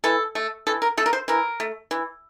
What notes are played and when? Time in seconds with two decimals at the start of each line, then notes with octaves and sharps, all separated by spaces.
0.04 E3 A4
0.35 A3
0.67 E3 A4
0.82 A#4
0.98 A3 A4
1.06 A#4
1.13 C5
1.28 E3 A#4
1.60 A3
1.91 E3